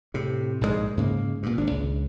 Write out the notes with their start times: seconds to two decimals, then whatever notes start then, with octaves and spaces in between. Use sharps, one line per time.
0.14 A2 C3
0.61 A#1 G#2 B2 G#3
0.97 G#2 C#3 A#3
1.43 G2 A#2
1.58 G#1 D4
1.71 C#2